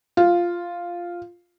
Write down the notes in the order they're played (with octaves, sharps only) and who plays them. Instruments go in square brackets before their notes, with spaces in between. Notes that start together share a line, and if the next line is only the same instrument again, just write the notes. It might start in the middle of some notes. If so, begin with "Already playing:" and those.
[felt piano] F4